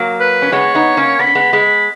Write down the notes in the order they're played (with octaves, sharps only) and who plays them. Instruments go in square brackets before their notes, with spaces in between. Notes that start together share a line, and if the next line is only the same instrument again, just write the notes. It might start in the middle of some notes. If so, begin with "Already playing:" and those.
Already playing: [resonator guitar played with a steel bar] F#3 A#3
[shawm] B4
[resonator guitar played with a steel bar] C#4
[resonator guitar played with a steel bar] G#3 B3 [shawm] C#5
[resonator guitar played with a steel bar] B3 D#4
A#3 C#4
[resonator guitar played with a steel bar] B3 [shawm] B5
[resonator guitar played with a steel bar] C#4
G#3 B3
[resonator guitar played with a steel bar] G#3 [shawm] B5